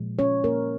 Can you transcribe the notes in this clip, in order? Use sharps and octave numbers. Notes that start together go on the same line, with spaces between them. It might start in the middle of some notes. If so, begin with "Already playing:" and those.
Already playing: A#2 F3 G#3
C#4 C#5
A#3 A#4